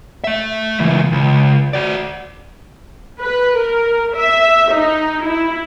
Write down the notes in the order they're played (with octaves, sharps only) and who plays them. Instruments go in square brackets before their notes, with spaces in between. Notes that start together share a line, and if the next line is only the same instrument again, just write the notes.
[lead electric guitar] A3 E5
C#2 E3
C#2
F#4 D5
[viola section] B4
A#4
E5
D#4
E4